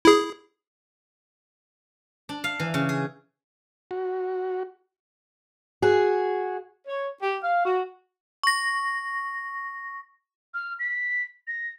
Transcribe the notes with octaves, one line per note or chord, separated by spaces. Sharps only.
E4 G#4
D4
F5
E3
C#3
G#4
F#4
F#4 G#4
C#5
G4
F5
F#4
C#6 A#6
F6
B6
A#6